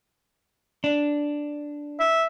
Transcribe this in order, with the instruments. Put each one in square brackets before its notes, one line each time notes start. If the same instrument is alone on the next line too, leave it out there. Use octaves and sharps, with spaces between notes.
[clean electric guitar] D4
[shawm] E5